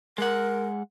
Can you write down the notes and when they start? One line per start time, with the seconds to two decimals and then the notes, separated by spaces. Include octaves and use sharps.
0.18 G#3 A#4 F#5